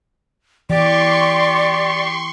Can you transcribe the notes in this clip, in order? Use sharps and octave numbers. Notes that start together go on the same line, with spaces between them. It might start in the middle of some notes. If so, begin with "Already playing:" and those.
E3 G4 D5 C6 C#6